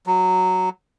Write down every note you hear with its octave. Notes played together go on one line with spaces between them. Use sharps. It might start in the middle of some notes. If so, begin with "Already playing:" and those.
F#3